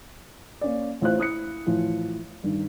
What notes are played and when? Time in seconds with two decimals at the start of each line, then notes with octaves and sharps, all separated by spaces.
0.61 A#3 C#4 D5
1.01 A1 A2 F4 C5 F#6
1.18 E4 D#6 F#6 C#7
1.66 A2 E3 F3
2.44 G2 D#3